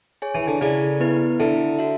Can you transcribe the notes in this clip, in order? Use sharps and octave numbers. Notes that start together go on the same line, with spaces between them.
G#4 C#5 G#5
E3
D3
C#3 E4 A4 D5
B3 E4 B4
D3 E4 A4 E5
F#4 A4 E5